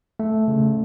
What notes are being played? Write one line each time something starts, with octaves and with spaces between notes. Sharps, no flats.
A3
C#3